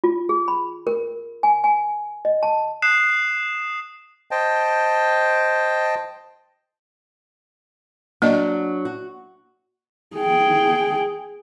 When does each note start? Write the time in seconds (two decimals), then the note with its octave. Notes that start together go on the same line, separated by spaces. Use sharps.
0.04 F4
0.29 G#4
0.48 B5
0.87 A#4
1.43 G#5
1.64 G#5
2.25 D#5
2.43 A5
2.82 D#6 F#6 C7 E7
4.31 C5 D#5 G5 A5
8.22 F#3 A#3 D4 D#5
8.85 F#4
10.17 G#4 G5